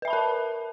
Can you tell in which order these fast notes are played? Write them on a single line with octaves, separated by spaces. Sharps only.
B4 E5 B5 A5 A#4